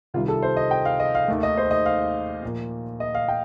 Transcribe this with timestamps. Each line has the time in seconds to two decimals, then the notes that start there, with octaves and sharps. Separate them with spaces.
0.14 C2 C3 D#3 G3 F4
0.28 A4
0.42 C5
0.57 D#5
0.71 G5
0.85 F5
1.00 D#5
1.15 F5
1.28 D#2 D#3 A3
1.43 D#5
1.57 C5
1.71 D#5
1.86 F5
2.43 A#2 F3 A#3
3.00 D#5
3.15 F5
3.28 G5